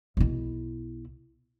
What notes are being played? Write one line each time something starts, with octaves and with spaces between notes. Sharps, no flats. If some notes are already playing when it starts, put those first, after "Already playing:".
B1 E4